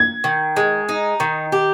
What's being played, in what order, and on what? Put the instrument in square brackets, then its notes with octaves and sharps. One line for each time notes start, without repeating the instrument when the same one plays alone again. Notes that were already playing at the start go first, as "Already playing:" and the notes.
Already playing: [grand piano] G#6
[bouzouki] D#3
G#3
D#4
D#3
G4